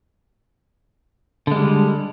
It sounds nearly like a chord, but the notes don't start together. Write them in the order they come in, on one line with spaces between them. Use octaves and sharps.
D3 G#3 G3